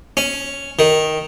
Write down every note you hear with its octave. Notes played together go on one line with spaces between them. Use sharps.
C#4
D#3